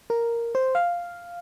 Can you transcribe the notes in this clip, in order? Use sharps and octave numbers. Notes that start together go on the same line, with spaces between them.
A#4
C5
F5